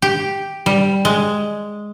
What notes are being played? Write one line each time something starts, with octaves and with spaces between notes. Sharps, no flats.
G4
G3
G#3